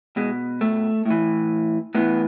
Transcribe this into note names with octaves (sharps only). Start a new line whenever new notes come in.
B2 G#3
A3
A2 E3
A2 E3 B3